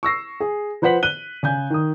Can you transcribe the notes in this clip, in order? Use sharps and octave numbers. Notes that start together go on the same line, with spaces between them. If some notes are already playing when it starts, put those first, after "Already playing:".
C#6 E6 A#6 C7
G#4
F3 B4 C5 F#5 B6 F#7
F#6 D#7 G7
C#3 G#5 G6
D#3 D#6